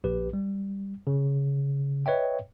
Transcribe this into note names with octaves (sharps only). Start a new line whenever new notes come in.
A#1 G4 B4
G3
C#3
B4 C#5 D#5 E5 G5